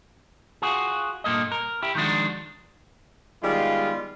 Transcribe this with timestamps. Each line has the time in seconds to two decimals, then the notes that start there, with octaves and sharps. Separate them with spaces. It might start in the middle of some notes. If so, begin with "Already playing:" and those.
0.62 F4 F#4 G#4
1.24 G2 A#2 A#3 A4 D#5
1.52 A#4
1.83 E4 G4
1.95 D#3 F3 G#3 D4 F#4
3.43 D#3 G3 G#3 B3 F4